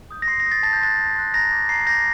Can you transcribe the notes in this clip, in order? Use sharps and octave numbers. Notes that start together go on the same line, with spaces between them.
D#6 G6
A#6
C6 C7
A#6
D#6 G6
A6
A5 A6
G6
C6 F#6 A6
A5
C6 F#6
A#5 A#6
D6 G6
A#5 C7
D6 G6 A#6